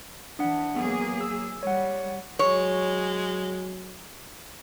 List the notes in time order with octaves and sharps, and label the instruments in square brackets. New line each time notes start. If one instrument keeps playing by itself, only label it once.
[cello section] E3 [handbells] D4 F#5
[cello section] F#3 A#3 G#4 [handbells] B3
[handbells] E6
[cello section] G3 [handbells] C#5 F#5
[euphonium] F#3 [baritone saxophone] G#3 [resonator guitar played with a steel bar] C#5